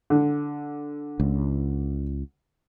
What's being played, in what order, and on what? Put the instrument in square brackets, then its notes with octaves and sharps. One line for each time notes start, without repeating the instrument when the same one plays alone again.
[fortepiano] D3
[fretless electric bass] C#2